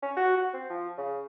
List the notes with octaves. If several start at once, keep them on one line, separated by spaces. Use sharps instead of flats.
C#4
F#4
F#4
C4
F3
C#3